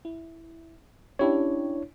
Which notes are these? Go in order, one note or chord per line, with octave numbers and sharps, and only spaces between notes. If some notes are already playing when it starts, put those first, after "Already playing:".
E4
C#4 D4 E4 G4 C#5